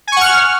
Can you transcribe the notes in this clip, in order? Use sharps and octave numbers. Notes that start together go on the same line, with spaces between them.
F#5 G#5 C#6 F6